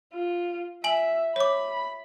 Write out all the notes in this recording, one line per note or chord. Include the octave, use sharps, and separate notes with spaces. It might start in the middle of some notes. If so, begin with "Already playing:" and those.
F4
E5 G#5 F#7
C#5 B5 D6